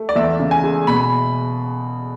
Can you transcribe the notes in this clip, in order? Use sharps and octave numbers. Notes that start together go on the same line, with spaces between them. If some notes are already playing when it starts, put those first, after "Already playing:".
Already playing: A3
D5
E2 E5
C#3
G#5
G#3
B2 B5